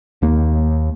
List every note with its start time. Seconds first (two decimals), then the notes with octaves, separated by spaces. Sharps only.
0.22 D#2 A#3